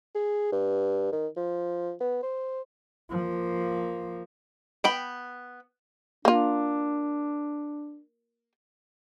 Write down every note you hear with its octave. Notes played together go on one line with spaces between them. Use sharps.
G#4
G2
D#3
F3
B3
C5
F3 A#3
B3 G5 B5
A#3 D4 F4